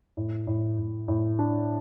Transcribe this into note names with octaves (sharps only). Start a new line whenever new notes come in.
A2
A2
A2
A2
D4